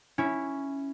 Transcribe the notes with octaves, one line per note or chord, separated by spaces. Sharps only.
C#4 E4